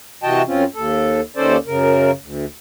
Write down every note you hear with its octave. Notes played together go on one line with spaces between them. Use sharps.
C3 E3 F#4 D#5 G5 A5
F#2 C4 C#4 F4
D#2 A4
D#2 D#3 C#4 A4 C5 D5
F#2 C#3 A#4
D2